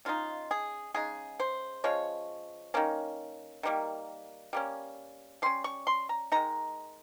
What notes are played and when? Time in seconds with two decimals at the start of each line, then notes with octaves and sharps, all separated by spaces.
0.05 C#3 G#3 C4 D#4 F4
0.51 G#4
0.94 C#3 G#3 D#4 G#4
1.40 C5
1.84 F3 G#3 C#4 C#5
2.74 D#3 A#3 C#4
3.63 D#3 G3 A#3
4.53 G3 A#3 C#4
5.42 G3 C#4 C6
5.64 C#6
5.87 C6
6.09 A#5
6.32 D#3 G#3 D#4 A#5